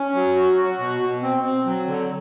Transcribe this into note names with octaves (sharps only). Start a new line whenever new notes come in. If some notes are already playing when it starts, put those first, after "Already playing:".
Already playing: C#4
F#3
F#4
F#4
B2
B2
C4
C4
F#3
D3